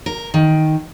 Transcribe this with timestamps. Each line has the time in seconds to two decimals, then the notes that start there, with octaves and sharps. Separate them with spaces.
0.06 A#4
0.34 D#3